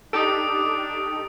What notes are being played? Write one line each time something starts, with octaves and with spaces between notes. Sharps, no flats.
D4 D#4 G4 A4 D6 D#6 D7